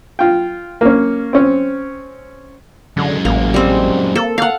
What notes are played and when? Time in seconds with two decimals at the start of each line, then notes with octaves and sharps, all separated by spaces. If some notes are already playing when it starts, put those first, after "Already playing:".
0.19 F4 G5
0.81 A#3 C#4
1.33 C4 C#4
2.97 F#2 D3 G#3
3.25 A1 A#3
3.54 G3 C4
4.15 A#3 A4
4.38 A#3 F5 F#5